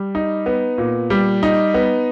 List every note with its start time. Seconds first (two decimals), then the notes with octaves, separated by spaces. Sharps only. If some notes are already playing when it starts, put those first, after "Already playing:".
Already playing: G3
0.15 D#4
0.46 B3
0.78 A#2
1.10 G3
1.43 D#4
1.74 B3